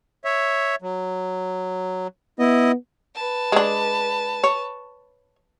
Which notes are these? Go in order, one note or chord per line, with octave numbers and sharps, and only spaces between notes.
C#5 E5
F#3
B3 E4 D#5
B4 A5
G#3 D4
C#5